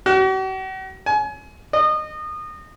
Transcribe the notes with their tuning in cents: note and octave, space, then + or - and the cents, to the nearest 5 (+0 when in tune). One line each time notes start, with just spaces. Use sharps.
F#4 +45
G#5 +30
D#5 -25